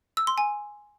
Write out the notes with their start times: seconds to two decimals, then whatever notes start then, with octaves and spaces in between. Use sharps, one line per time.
0.17 E6
0.27 C6
0.38 G#5